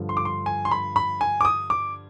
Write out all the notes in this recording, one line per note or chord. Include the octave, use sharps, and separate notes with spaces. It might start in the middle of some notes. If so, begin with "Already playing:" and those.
Already playing: G2 D3 F3
C6
D6
C6
G#5
C6
B5
B5
G#5
D6
D#6
D6